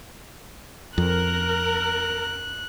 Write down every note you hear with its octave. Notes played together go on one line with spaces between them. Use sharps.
F2 A#4 F#6